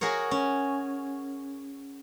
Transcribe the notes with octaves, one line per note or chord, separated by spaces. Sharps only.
F#4 G#4 A#4 C#5
C#4